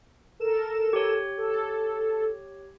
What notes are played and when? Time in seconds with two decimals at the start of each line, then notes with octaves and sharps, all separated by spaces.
0.40 A4 A#4 E7
0.93 G4 C#5
1.38 A4